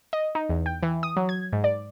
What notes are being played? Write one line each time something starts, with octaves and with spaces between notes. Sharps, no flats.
D#5
D#4
E2
G5
E3
D#6
F#3
G#6
G#2
D5